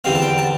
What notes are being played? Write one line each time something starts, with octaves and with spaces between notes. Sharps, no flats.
E2 D3 G3 C4 F5
A5
G5
A5